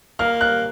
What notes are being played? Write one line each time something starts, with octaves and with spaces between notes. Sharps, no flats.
A#3 F6
F#6